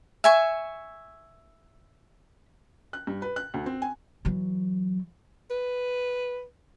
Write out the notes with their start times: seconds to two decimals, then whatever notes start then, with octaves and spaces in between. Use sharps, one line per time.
0.24 E5 G#5 C#6
2.93 F#6
3.07 G2
3.22 B4
3.36 F#6
3.54 D2
3.66 C4
3.82 G#5
4.25 E3 F#3
5.51 B4